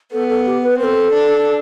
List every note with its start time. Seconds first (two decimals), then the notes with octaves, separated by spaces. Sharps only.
0.12 B3 A4
0.29 A4
0.46 G4
0.63 B4
0.79 C4 B4
0.84 A4
1.12 D4